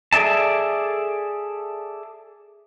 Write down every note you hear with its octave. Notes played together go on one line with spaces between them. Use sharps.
G#4 A4 D5 E5 A5